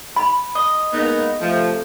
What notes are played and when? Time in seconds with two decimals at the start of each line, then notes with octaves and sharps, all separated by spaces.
0.16 B5
0.55 D#5
0.93 G#3 A#3 B3 D#4
1.41 C3 F3 A3